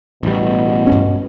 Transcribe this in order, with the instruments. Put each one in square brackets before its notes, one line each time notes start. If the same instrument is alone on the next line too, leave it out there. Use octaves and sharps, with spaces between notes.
[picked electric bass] A1 G3 [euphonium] B2
[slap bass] G2 C#4